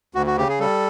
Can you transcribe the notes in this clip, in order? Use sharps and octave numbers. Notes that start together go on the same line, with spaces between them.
D2 F#4
F#4
C#3 G4
G#4
G3 A4